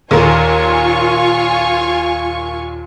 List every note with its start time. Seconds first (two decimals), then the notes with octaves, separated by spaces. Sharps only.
0.11 D#2 A#2 F4 A#4 G#5 C#6